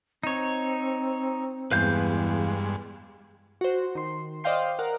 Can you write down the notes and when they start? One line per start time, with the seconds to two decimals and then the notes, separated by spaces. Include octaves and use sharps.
0.23 C4 D#4 C#5
1.71 E2 G2 G#3 B4 F5 G6
3.61 F#4 C5
3.95 D#3 C6
4.44 C5 D5 D#5 F5 G5 C6
4.79 A#4 F5 F#5